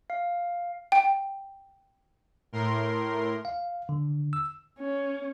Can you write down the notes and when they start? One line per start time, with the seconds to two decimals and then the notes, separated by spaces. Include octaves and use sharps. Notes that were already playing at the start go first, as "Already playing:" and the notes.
0.10 F5
0.92 G5
2.53 A2 A#4 C6
3.45 F5
3.89 D3
4.33 E6
4.79 C#4